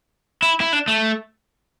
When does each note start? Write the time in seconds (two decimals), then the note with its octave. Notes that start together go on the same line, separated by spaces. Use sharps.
0.42 E4
0.60 E4
0.73 D4
0.88 A3